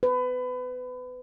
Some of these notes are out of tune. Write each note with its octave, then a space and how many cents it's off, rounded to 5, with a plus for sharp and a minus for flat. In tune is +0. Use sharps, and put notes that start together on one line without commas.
B4 +25